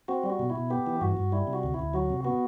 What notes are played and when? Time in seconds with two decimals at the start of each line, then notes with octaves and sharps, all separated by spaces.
0.08 C4 F#4
0.24 G3
0.30 F#4
0.39 B2
0.50 E4
0.56 B2
0.70 B3 G4
0.87 E3
1.01 G2 F#4
1.17 G2
1.32 G3 E4
1.47 C3
1.53 F#4
1.63 D2
1.74 E4
1.79 D2
1.94 F#3 F#4
2.10 C3
2.24 B3 F#4